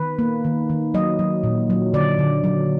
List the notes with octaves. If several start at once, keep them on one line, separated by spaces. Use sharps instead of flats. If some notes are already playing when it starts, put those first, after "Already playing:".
Already playing: D#3 B4
A#3
D#3
D#3
F#3 D#5
F#3
A#2
F#3
D3 D5
D3
F#3